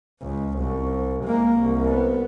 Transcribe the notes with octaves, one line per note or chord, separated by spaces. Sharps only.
C#2
C2
G#3 A#3
C2
B3